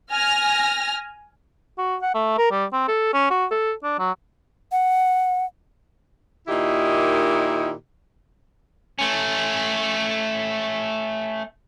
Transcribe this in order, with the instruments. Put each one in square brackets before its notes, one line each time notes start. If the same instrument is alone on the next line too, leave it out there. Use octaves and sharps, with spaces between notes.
[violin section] G#5 F6 A#6
[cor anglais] F#4
F#5
A3
A#4
G3
C4
A4
C#4
F#4
A4
D4
F#3
[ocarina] F#5
[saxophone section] A#2 D#3 D#4 E4 G4
[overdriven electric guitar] A3 C#4